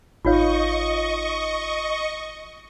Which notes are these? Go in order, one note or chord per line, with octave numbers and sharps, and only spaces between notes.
G#1 D#4 F4 C#5 D#5 F5 C#6